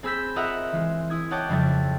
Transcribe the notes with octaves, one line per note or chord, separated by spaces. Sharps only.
C4 G#4 B5 E6 G6 B6
F4 A#4 D#5 E5 F#5 F6
E3 G#3
E4 D#6 G#6
C#5 D#5 F#5 G5 A5 D6
F2 C#3 G3 E4 A6